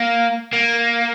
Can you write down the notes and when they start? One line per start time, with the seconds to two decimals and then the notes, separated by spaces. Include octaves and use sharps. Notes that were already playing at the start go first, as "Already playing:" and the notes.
Already playing: A#3
0.53 A#3